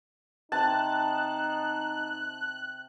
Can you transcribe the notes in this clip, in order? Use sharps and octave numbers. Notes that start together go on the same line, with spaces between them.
C3 D#4 A5 F#6